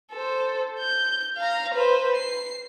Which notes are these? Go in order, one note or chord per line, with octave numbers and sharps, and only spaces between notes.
A4 C5
G6
F5 A#5
B4 C5
C7